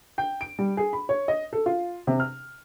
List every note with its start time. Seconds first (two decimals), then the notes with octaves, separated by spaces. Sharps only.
0.18 G5
0.41 D7
0.59 G3
0.77 G#4
0.93 B5
1.09 C#5
1.28 D#5
1.53 A4
1.66 F4
2.07 C3
2.20 F6